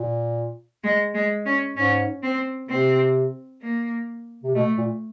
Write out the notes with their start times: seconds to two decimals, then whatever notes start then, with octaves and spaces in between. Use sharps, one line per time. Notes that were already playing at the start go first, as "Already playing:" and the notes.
Already playing: A#2
0.83 G#3
1.14 G#3
1.46 C#4
1.77 G#2 C#4
2.23 C4
2.69 C3 C4
3.62 A#3
4.43 C3
4.55 B2 A3
4.78 A#2